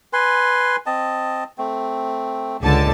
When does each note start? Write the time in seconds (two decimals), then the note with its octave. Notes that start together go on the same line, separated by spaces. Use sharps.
0.13 B4 G#5 C6
0.86 C4 D#5 A5
1.58 A3 C4
2.62 C#2 D3 A5